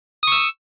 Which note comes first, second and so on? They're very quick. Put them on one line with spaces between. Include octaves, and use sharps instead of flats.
D#6 C#6 E6